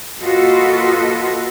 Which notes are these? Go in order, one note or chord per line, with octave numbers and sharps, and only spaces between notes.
A#3 F4 F#4 A4 B4 D#5